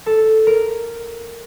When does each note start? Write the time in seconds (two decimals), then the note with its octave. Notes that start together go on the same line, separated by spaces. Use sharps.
0.06 A4
0.47 A#4